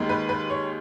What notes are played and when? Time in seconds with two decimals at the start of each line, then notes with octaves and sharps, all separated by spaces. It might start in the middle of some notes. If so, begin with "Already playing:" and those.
Already playing: D#2 D#3 G#3
0.09 B4
0.29 B4
0.50 C#5